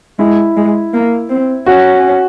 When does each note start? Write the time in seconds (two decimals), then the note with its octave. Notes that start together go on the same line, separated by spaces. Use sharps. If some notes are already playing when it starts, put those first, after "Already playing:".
0.19 G#3 E4
0.56 G#3
0.94 A#3
1.29 C4
1.66 C#4 F#4